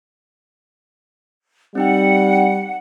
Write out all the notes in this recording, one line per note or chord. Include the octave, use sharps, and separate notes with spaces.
G3 C4 D#4 F#5 G5